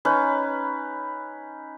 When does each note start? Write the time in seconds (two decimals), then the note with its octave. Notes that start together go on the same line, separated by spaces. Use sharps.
0.05 C#4 D#4 B4